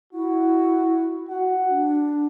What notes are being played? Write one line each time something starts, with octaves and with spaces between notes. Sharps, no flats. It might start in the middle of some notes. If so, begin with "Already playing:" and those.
E4 F#4
F#4 F#5
D4